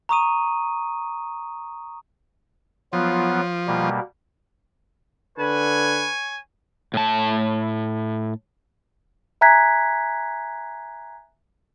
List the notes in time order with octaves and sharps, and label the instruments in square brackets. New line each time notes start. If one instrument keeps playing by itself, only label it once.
[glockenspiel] A#5 C#6 D#6 D#7
[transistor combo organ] F3 [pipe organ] F#3 B3 F4
[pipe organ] B2 G3 A#3
[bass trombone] D3 [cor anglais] B4 [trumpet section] C#5 G#5
[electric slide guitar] A2 A5
[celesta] E5 G#5 A#5 F#6 G#6 B6